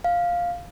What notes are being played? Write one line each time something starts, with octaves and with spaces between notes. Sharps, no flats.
F5